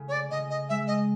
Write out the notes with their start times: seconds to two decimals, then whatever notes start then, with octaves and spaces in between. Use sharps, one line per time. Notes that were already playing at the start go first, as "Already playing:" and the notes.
Already playing: C#3 A3
0.09 C#5
0.12 D5
0.31 C#3 D#5
0.50 D#5
0.69 G#3 E5
0.87 D#5